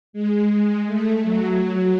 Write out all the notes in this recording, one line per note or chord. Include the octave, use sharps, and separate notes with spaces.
G#3
A3
F#3